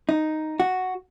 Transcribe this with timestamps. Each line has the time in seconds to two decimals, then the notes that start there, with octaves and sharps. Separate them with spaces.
0.09 D#4
0.60 F#4